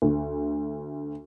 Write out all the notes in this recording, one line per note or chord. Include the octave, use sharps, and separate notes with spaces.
D2